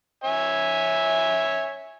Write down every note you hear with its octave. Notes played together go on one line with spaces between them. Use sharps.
C#5 E5 G#5